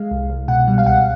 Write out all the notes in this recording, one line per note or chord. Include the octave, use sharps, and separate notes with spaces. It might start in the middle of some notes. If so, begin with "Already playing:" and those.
Already playing: G#3 F5
C2
C2
B2 F#5
G3
F5
C#2 F#5